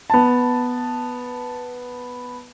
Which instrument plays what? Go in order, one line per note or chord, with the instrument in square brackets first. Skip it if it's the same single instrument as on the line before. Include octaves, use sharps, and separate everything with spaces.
[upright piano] B3 A5